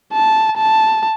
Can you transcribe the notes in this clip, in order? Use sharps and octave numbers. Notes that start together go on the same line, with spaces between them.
A5
A5